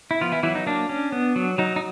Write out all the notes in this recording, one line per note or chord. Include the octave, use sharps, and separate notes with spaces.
E4
F3 B3 F4
E3 E4
E3 F#3 E4
D#4
A#3 D4
C#4
B3
F#3
F#3 D#4
D#4